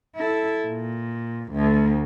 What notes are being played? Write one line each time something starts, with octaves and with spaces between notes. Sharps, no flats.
E4 A4
A#2
D2